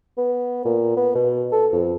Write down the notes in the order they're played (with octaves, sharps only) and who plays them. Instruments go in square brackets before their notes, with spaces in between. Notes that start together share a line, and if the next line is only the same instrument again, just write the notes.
[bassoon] B3
A#2
B3
B2
A4
F2